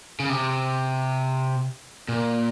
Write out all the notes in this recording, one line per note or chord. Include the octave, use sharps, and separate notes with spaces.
C#3
C3
A#2